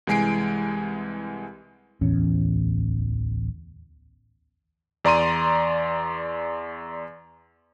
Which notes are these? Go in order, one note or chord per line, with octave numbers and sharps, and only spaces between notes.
C2 E3 G#3 G#5 C7 D7
D1 A1 E2 C#4
E2 D5 A#5 C6 D#7